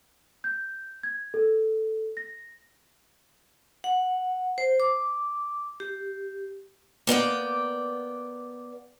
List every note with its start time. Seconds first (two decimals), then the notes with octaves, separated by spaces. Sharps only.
0.44 G6
1.03 G#6
1.34 A4
2.17 A#6
3.84 F#5
4.58 C5
4.80 D6
5.80 G4
7.07 A#3 B3 D5 G5